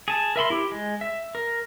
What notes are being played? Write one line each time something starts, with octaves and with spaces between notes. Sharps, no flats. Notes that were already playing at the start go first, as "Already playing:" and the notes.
G#4 A5
A#4 E5 B5 C6
E4 G4
G#3
E5
A#4